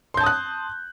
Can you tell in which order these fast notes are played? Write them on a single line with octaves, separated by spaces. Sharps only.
C6 G6 A5 D#6 F#6